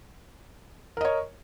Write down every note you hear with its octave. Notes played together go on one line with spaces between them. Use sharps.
A#4 C#5 D#5